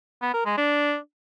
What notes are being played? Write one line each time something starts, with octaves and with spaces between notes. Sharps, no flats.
B3
A#4
G#3
D4